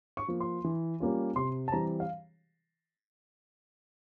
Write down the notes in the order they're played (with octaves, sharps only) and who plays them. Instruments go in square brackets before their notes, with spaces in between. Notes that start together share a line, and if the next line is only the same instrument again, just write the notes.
[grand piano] C#6
F3 A#3
C6
E3
G3 A#3 C#4 F4
C3 C6
A5
E3 G3 C4 A#5
F5